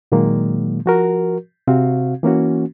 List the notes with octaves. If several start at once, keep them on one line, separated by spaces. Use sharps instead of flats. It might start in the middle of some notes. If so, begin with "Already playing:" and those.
A#2 D#3 F#3 G#3 A#3
F3 F#4 A#4
C3 C4 F#4 F5
E3 A#3 C#4 F#4